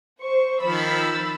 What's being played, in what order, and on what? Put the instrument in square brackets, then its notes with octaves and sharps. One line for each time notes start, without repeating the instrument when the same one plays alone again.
[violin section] C5 C#6
[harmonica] D#3 F3 [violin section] B5 E6 A6